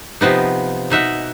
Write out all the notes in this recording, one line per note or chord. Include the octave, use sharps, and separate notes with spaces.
C3 F3 B3 D#4
B2 D#4 E5 F#5